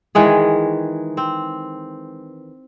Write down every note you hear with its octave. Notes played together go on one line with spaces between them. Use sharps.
D#3 E3 G#3 G#4
C4